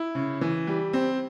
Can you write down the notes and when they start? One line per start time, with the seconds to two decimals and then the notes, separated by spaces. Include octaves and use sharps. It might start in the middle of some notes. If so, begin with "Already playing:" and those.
Already playing: E4
0.15 C#3
0.41 E3
0.67 G3
0.93 C4